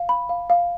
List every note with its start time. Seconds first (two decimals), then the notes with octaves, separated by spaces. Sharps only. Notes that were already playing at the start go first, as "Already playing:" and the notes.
Already playing: F5
0.09 B5
0.29 F5
0.50 F5